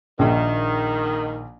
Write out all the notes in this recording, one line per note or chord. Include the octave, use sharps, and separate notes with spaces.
A#1 D#3